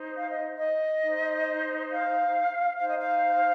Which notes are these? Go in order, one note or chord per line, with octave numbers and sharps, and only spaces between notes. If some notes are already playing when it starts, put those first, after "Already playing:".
Already playing: D#4 C5
F5
D#5
D#5
D#4 C5
F5
D#4 C5 F5
D#5
F5